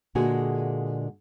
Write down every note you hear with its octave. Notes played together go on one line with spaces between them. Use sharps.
A#2 D3 G#3 A#3 F#4 G#4